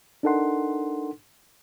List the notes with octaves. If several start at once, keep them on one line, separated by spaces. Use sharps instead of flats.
D4 D#4 A4 A#4 F#5 C6